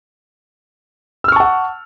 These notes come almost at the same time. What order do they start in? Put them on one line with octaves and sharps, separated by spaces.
E6 F6 C#6 A5 F#5